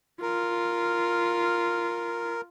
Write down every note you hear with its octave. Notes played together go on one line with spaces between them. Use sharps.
F4 A#4